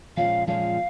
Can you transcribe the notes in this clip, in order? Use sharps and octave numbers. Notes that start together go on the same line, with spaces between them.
A#2 F3 G#3 C#4 F5
A#2 F3 G#3 C#4 F5